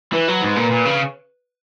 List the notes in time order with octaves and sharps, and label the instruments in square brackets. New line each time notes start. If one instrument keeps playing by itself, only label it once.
[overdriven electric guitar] E3 [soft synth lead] B4
[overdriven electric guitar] F#3
G#2
A#2
A#2
C#3